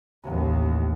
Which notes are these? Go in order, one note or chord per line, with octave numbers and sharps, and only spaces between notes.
A1 D#2